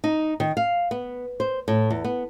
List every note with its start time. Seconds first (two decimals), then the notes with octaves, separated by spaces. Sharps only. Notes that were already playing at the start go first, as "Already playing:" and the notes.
0.04 D#4
0.40 D#3
0.57 F5
0.91 B3
1.40 C5
1.68 A2
1.90 E2
2.04 B3